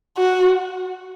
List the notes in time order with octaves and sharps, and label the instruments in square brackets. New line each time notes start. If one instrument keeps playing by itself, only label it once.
[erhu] F#4